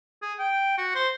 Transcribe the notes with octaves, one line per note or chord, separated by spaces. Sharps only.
G#4
G5
F#4
C5